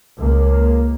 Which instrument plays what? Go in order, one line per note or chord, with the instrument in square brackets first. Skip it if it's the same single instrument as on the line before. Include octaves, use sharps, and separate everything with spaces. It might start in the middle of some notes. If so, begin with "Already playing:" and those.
[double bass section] C#2 A#3